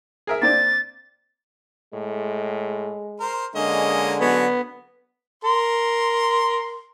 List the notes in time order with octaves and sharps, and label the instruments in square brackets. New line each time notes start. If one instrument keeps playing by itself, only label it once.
[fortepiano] G#4 A#4 E5
[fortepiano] A#3 C4 D4 [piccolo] A6
[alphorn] A2 [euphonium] G#3
[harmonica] A#4 C5
[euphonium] D3 [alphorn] G#3 [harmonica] A#3 C#4 D#5
[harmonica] F#3 C#4 C#5 [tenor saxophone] B3
[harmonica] A#4 C6